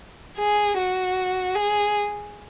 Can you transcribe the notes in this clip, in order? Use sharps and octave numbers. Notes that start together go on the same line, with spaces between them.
G#4
F#4
G#4